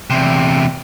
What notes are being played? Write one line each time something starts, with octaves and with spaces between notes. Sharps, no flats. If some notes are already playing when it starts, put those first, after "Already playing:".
E2 C3